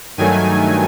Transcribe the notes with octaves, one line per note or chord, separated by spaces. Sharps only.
G2 D#3 F#3 A3 G#5